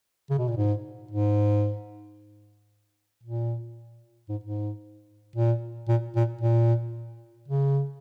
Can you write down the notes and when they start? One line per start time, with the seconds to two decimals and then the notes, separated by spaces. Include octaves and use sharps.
0.30 C#3
0.38 B2
0.48 A#2
0.57 G#2
1.11 G#2
3.23 A#2
4.29 G#2
4.44 G#2
5.36 A#2
5.88 A#2
6.16 A#2
6.41 A#2
7.48 C#3